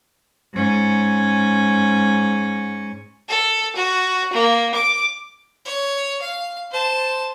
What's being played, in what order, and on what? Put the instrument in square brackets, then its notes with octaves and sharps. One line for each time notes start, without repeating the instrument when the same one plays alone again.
[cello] G#2 C#4
[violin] A4
F#4
A#3
D6
[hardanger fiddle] C#5
F5
C5 A5